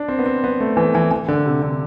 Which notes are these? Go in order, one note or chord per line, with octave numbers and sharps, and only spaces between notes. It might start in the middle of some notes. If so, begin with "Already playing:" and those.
Already playing: D4
C4
B3
C4
B3
A3
E3
E3
E3
D3
C3
D3